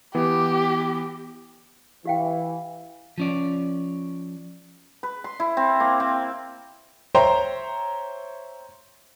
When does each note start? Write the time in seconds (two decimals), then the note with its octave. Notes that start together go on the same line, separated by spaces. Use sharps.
0.15 E3 B3 G4
2.05 E3 G4 F5 G5
3.18 F3 C#4 D5
5.03 B4
5.24 C6
5.40 E4
5.57 C4
5.80 A#3
6.00 C4
7.15 C5 C#5 E5 G5 A#5 C6